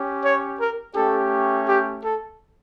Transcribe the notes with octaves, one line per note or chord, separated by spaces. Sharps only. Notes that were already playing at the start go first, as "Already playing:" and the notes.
Already playing: C#4 G4
C#5
A#4
A3 C#4 G4 A4
G4
A4